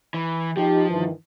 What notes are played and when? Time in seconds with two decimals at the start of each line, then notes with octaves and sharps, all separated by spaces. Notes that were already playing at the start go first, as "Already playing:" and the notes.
0.14 E3
0.57 F3 D#4 G4
0.90 G2 D#3 E3